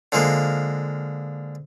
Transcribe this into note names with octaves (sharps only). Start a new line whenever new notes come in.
D3 F3 G#3 A#3